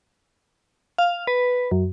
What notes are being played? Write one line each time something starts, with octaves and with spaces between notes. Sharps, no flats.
F5
B4
F#2